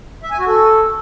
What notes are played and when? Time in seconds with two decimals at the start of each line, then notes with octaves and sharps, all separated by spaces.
0.23 E5
0.31 G#5
0.39 F#4
0.47 A4